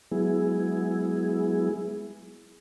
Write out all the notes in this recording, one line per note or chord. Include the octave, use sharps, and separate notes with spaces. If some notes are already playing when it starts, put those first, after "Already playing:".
F#3 G#3 B3 E4 G#4